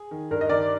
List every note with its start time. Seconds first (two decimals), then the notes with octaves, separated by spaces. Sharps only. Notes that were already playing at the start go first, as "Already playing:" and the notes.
Already playing: G#4
0.11 D#3
0.31 G2 A#4
0.41 D#5
0.49 D#3 A#4 D5